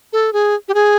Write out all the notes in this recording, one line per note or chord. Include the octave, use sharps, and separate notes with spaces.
A4
G#4
G4
G#4